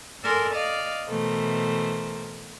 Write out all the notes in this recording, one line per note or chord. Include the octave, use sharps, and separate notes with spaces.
A4 A#4 D5 G#5 C6
D5 D#5 F5 F6
B2 E3 A3 A#4 C5